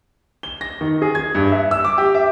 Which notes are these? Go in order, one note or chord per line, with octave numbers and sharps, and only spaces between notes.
G7
A#6
D#3
G#4
G#6
G2
E5
E6
D6
G4
E5